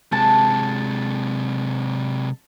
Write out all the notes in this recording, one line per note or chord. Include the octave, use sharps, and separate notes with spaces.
C3 G#3 A5